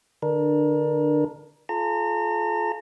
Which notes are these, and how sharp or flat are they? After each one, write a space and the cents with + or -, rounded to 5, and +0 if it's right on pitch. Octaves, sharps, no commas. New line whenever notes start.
D3 +15 D4 +25 A#4 +30
F4 +0 A4 -45 A#5 -35